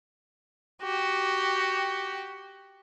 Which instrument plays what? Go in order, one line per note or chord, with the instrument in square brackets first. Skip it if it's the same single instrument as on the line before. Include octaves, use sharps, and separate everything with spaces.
[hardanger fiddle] F#4 G4